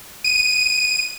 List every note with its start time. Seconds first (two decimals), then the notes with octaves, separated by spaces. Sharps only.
0.24 D#7